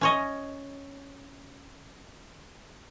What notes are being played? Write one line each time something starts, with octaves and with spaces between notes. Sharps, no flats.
C#4 C#5 D#5